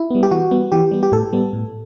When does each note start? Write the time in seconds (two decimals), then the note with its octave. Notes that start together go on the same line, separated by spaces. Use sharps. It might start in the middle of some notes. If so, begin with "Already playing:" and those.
Already playing: E4
0.10 G3 B3
0.23 G4
0.31 E3 F#4
0.51 G3 B3
0.72 E3 G4
0.91 G3 B3
1.03 G4
1.12 A2 A4
1.33 G3 B3
1.53 A2